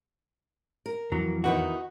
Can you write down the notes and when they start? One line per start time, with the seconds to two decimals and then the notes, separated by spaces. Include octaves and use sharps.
0.86 A#4
1.12 F2 E3 F#3 A#5
1.44 E2 D#3 D#4 F#4 B4 F#5